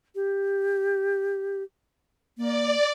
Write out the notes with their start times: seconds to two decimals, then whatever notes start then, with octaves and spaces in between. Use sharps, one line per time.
0.15 G4
2.38 A#3 D5